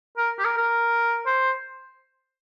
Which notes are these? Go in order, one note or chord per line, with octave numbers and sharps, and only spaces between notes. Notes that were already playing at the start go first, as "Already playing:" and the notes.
A#4
G4
A#4
A#4
C5